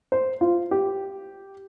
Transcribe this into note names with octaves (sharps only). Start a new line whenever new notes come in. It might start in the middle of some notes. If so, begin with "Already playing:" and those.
C5
F4
G4